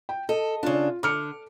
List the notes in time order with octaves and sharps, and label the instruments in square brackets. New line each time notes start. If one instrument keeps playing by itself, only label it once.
[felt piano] G5
[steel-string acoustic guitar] A4 [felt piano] D#5
[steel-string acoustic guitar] C#3 D4 [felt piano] F4
[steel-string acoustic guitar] D3 [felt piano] D6 F6 C#7